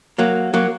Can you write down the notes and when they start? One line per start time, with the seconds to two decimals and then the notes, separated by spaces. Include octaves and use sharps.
0.18 F#3 A#3
0.54 F#3 A#3